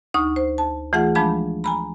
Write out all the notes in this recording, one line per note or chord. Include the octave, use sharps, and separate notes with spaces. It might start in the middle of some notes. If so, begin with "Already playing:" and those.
D2 D#4 C#6 D#6
C5
A5
E3 A3 F4 G#4 F#5 G6
F3 G#3 D4 A5 B5 G6
G#5 A#5 B5